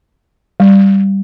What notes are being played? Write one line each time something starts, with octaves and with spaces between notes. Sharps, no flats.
G3